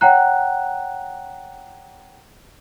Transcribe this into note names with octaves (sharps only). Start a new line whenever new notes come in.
C#5 F#5 G5 A#5 F#6